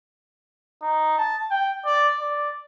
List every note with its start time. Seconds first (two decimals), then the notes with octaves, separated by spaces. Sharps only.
0.82 D#4
1.18 A5
1.51 G5
1.86 D5
2.20 D5